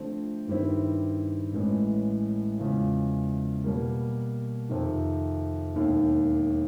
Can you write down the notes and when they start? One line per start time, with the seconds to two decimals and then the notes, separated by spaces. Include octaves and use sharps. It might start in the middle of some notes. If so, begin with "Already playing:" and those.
Already playing: D3 F3 A3 C4
0.47 G2 D#3 G3 C4 E4
1.53 A1 A2 E3 G#3
2.59 E2 C#3 F3 G#3
3.64 B2 G3 A#3
4.69 F2 C3 D#3
5.75 E1 D#2 D#3